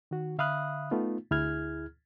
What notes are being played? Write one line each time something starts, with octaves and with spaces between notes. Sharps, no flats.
D#3 F#4
D3 E5 F5 B5 D#6 F#6
A3 B3 D#4 F4
D2 E4 G#4 F6 G#6